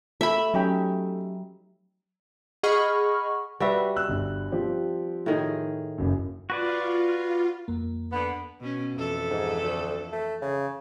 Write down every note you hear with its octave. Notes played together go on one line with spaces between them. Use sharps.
A3 E5 B5
F#3 C#4 D#4 G4
G#4 D#5 F#5 B5 C#6 F6
G3 F#4 B4 E5
E6 F#6
G1
F3 C4 G4
A2 D#3 G#4
F#1 F#2
F4 F#4 B4 D5
F2 A#3
D3 B3
B2 C#4
F2 E3 A4
G#2
D2
A3
C#3